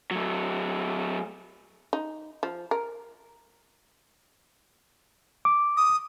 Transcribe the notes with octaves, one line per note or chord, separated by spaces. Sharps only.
F#3 A3
D#4
F3
A#4
D6
D#6